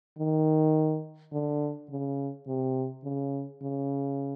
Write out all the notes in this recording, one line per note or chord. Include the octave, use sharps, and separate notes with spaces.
D#3
D3
C#3
C3
C#3
C#3